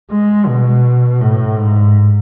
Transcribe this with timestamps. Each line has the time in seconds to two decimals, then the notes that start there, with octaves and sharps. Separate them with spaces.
0.11 G#3
0.48 B2
1.21 A2
1.58 G#2